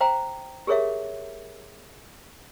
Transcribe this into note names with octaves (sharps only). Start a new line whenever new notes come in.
C5 F5 G5 A#5
G4 G#4 A#4 C#5 E5 F5